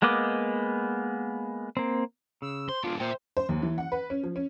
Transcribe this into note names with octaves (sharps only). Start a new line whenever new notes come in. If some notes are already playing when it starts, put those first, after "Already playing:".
G#3 A#3 B3 D#5 D6
A#3 C4
C#3 E6
C5 C6
G#3 B3 D4 F4
A#2 C5 E5 G5
C5
D#2
E3
F#5
B4
C#4
F3
C#4